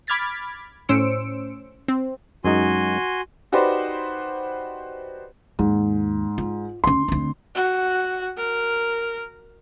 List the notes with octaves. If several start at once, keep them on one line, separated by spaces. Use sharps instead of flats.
B5 D6 F6 G#6 A6 B6
A2 C#4 C5 E6 C#7 D7
C4
F#2 G#3 D#4 F#4 G#5 C6
D#4 F#4 G4 B4 C5 D5
D#2 G#2
F4
D2 C#4 C6
D2 C4
F#4
A#4